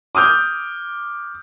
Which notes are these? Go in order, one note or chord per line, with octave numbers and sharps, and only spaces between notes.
D6 D#6 F6 G6